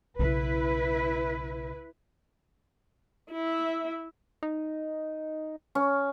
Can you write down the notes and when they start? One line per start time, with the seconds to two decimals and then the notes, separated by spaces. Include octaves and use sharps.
0.19 B1 C#3 E4 B4
3.31 E4 E5
4.43 D#4
5.75 C#4